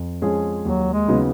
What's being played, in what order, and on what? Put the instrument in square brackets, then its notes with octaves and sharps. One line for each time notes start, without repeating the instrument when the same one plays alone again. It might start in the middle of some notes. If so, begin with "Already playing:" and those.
Already playing: [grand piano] F2
F3 G#3 C#4 G#4
[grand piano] D#2 [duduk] F#3
[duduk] G#3
[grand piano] C#3 F#3 B3 D#4